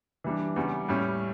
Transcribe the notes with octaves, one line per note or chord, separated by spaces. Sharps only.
E3 G3 D4
E2 C#3 G3
A2 G3 C#4